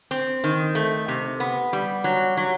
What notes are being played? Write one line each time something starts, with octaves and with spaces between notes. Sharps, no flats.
C4
D#3
A3
C3
B3
G3
F#3
F#3